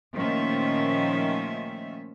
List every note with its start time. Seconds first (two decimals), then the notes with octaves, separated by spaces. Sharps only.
0.17 A#2 D#3 F3 A3 C#4 E5